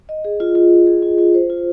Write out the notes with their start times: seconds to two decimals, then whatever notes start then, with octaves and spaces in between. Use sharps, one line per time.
0.09 D#5
0.25 G#4
0.40 F4
0.55 F4
0.71 D#5
0.87 G#4
1.03 F4
1.18 F4
1.34 C5
1.50 F4